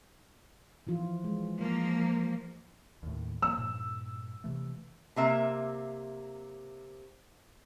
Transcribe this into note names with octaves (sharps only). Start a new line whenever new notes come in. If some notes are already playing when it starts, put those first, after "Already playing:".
E3 F3 F4
G#3
F3 A#3
D#2 A2
F3 A#3 E6
G2 A#2
C3 E3 A3
C3 A#3 E5